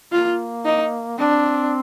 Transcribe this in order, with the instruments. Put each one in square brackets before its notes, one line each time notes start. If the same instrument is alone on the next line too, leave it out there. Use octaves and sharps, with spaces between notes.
[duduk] A#3 [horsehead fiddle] F4
[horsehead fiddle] D#4
[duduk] C4 [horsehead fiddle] D4